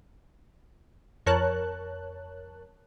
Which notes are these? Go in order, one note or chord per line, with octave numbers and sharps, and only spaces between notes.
F2 A#4 C#5 A5 F#6